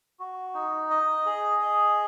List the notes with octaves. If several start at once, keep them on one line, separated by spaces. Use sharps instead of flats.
F#4
D#4
D#5
G#4
D#5